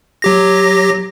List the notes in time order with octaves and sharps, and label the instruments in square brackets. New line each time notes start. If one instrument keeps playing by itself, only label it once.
[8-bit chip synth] F#3 G4 A#6